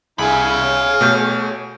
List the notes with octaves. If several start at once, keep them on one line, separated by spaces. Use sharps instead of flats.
C2 E4 G#4 F5 B5
G#4 C#5
B2 A3 G6